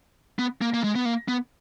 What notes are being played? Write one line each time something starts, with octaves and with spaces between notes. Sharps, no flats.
B3
A#3
A#3
G#3
B3
A#3
B3